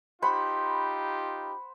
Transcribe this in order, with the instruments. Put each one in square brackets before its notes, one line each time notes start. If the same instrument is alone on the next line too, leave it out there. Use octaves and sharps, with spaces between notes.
[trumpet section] D#4 F4 G4 [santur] C5 F#5 B5